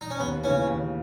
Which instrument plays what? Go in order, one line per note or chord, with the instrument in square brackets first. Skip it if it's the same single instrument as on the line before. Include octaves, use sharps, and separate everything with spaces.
[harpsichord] D#4
C#4
[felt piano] D#2 [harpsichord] B3
[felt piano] C#3 E3 B3 [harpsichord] C#4
[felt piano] D#2